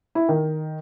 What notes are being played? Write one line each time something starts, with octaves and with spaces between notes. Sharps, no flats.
E4
D#3